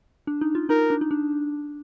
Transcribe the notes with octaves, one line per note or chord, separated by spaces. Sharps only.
D4
D#4
F4
D#4 A#4
D4
D#4
D4